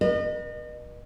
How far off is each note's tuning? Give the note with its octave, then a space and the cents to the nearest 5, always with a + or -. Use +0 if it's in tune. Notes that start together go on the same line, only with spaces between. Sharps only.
B4 -40 D#5 -40